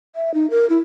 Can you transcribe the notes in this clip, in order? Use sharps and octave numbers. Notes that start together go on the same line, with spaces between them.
E5
D#4
A#4
E4